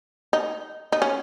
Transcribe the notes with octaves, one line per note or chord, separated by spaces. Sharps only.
D#4
D#4
C#4